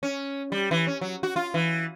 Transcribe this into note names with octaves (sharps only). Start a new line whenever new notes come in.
C#4
G3
E3
C#4
F#3
F#4
F4
E3